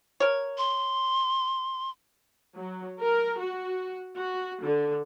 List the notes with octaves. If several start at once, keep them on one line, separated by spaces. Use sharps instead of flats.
A#4 C#5
C6
F#3
A#4
F#4
F#4
D3